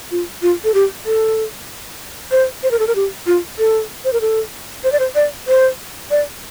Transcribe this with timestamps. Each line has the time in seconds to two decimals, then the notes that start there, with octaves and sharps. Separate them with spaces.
0.11 F4
0.42 F4
0.64 A4
0.74 G4
1.06 A4
2.31 C5
2.63 C5
2.71 A#4
2.79 A4
2.87 A#4
2.95 G4
3.27 F4
3.59 A4
4.05 C5
4.13 A#4
4.21 A4
4.84 C5
4.92 D5
4.99 C5
5.15 D5
5.48 C5
6.11 D5